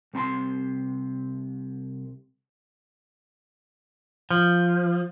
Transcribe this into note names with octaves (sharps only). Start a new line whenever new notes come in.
C2 C3 A#5 C6
F3